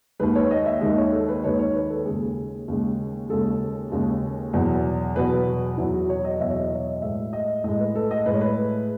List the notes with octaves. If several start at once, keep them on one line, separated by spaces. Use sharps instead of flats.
D#2 D#3 G#3 B4
C#5
D#5
E5
D#2 D#3 G#3 D#5
C#5
A4
B4
D#2 D#3 G#3 C#5
C#5
B4
A4
D#2 C#3 G#3 G#4
D#2 C#3 G#3
D#2 C#3 G#3 A4
D#2 C#3 G#3
E2 B2 F#3
E2 B2 F#3 B4
F#4
E2 B2 F#3 E4
F#4
C#5
D#5
E2 B2 F#3 E5
C#5
D#5
C#5
D#5
A2 G#3 E5
D#5
A2 G#3 D#5
B4
A4
D#5
A2 G#3 B4 C#5
B4